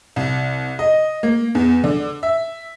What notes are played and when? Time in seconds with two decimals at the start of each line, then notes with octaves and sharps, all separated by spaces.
0.16 C2
0.79 D#5
1.23 A#3
1.55 E2
1.84 D3
2.23 E5